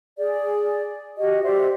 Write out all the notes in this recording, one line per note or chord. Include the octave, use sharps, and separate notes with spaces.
G#4 D5
F#4 G4 D#5
G4 C5 D5 E5